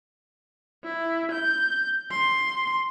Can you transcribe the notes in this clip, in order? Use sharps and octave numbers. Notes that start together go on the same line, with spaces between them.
E4
G6
C6